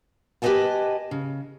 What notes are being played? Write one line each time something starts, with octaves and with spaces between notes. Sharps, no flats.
G4 B4 C5 D#5 G#5 A5
C#3